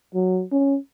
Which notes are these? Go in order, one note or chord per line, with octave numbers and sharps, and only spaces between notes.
F#3
C#4